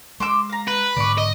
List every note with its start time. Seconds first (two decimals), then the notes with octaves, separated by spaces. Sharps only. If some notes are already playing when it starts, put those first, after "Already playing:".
0.20 G#3 C6 D6 E6
0.49 F5 A#5
0.68 B4
0.96 G#2 D3 D5 C#6
1.18 D#5